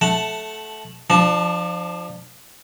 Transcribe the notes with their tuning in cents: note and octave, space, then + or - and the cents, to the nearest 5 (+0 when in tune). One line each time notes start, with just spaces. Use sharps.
A3 -15 F#5 +0 A5 +5
F3 +0 D4 +30 A5 -10